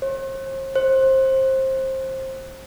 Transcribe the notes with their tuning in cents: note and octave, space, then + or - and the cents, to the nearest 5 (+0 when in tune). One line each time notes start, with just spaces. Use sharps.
C5 +45
C5 +20